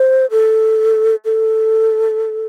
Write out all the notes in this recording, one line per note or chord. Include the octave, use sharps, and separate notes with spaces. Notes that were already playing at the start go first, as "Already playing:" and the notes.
Already playing: C5
A4
A4